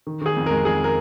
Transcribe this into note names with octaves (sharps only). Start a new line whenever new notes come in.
D#3
D#3 G#4
F2
G#3 A#4
F2 G#4
A#4